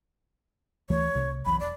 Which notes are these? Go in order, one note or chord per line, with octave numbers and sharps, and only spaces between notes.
D2 E3 A3 C#5
C2 C3
F1 B1 E3 B5
E1 D5